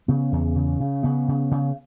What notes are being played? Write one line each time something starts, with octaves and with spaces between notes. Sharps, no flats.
C#3 B3
E2
C#3
C#3
C#3 B3
C#3
C#3